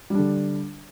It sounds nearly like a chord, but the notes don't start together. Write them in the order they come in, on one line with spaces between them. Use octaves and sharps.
G3 D4 D3